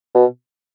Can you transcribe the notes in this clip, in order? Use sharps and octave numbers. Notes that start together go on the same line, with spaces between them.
B2